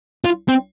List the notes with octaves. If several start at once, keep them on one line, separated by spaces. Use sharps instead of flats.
F4
C4